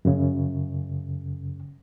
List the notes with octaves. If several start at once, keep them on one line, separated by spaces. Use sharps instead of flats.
F#2 C#3